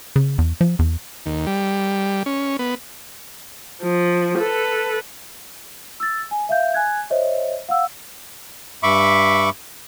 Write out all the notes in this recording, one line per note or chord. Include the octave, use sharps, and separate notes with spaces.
C#3
E2
F3
E2
D#2
G3
C#4
B3
F3
A4 B4
E6 A6
G#5
E5 F5 G6
G#5 F#6 G#6
C5 C#5 D#5 E5
F5 F#5 E6
G2 E5 B5 C#6 D6